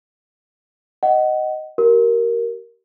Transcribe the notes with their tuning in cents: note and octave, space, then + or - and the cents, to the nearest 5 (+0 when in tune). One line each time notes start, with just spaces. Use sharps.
D#5 +0 F#5 +25
G4 -40 A#4 +0